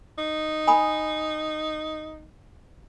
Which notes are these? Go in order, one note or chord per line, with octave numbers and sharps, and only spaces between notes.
D#4
G#5 B5 D#6